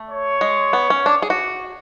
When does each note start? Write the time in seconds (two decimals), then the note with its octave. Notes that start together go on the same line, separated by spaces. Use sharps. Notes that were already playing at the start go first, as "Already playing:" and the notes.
Already playing: A3
0.09 C#5
0.41 G#3
0.73 B3
0.90 C#4
1.06 D4
1.22 G#4
1.30 F#4